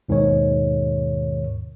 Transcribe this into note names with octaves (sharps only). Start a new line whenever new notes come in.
D#2 G#2 B2 D#3 C#5